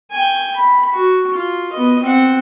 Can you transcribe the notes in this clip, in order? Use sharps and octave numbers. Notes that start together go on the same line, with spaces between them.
G5 G#5
B5
F#4
F4
B3 D#5
C4 F#5